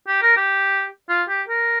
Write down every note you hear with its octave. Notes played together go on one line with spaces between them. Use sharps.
G4
A#4
G4
F4
G4
A#4